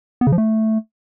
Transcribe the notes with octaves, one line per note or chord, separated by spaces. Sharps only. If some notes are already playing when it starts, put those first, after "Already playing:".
B3
C#3
F3
A3